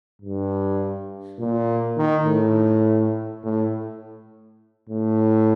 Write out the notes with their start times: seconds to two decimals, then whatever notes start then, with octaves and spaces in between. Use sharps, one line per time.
0.22 G2
1.39 A#2
1.97 D#3
2.26 A2
3.43 A2
4.89 A2